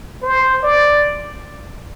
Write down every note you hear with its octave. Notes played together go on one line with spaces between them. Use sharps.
C5
D5